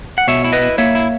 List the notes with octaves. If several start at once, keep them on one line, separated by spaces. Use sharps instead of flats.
F#5
B2 C#5 E5
E4
B4 D#5
E4
A#3 C#5 E5
E4